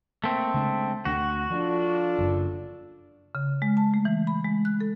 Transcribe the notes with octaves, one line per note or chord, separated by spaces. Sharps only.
A3 A#3 C4
C#3 G#3 D4
D2 A3 D4 F#4
F3 D4 F4 A4
F#1 F#2
C#3
G#3
A5
A3
E3
B5
G#3
F#6
A4